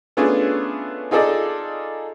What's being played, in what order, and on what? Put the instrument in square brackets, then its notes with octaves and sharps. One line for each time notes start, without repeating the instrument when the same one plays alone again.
[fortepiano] A3 B3 C#4 D4 F4 G#4
D#4 F4 G#4 A4 D5 D#5